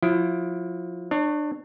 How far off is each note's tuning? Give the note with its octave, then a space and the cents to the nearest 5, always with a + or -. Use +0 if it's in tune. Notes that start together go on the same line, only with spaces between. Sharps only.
F3 +35 E4 +25
D4 +30 C#5 +0